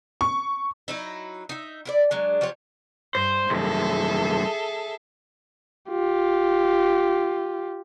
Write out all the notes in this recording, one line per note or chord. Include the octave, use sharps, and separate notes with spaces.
C#6
F#3 D#4 E4
D#4 E5
E4 F4 D5
F#3 G#3 D4
F3 F#3 G4 C#5
G2 C5
C2 F#2 G#4 A4 E5
F4 G4